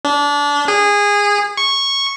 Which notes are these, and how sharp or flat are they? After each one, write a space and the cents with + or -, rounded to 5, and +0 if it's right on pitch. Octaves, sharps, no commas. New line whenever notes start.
D4 -25
G#4 -20
C#6 -10